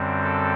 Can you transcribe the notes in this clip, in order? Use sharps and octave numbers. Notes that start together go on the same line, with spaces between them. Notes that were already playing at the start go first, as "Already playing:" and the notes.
Already playing: F#2 D3 G3 C4
A4